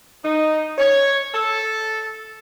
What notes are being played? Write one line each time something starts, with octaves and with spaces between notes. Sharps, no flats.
D#4
C#5
A4